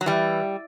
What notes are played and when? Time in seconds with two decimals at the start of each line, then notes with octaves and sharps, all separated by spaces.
0.01 F#3
0.06 E3 G3